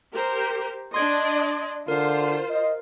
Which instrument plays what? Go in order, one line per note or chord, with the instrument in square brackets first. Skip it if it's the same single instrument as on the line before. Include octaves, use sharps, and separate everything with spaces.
[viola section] G4 A#4 C5
[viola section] D4 D5 D#5 [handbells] C6 G#6
[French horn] D3 [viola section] F4 C5 [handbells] A#4
[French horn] D#5